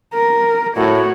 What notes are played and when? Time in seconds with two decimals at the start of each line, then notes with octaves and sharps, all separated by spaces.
0.14 A#4
0.76 A2 F#4 C#5